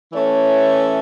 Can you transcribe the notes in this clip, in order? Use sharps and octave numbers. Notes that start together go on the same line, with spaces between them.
E3 A3 C#4 C#5